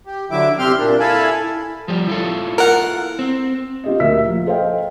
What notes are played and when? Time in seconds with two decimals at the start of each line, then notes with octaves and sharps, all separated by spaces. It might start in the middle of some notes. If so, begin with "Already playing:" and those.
0.06 G4
0.31 D3 F#3 E4 E5 D6
0.58 C3 C4 G4 C6 F6
0.78 A#2 A#3 D4
1.00 E4 A4 F5 G#5 A5 B5
1.88 F3 G3 G4
2.07 E4 F4 A4
2.58 A#4 F#5
3.19 C4
3.84 F4 G4 D#5
4.00 D2 A#2 A#4 E5 E6 B6
4.25 F3
4.46 G#4 A4 C5 D#5 F5 G5